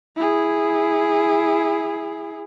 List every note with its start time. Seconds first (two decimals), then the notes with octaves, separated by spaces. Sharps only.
0.16 E4 G#4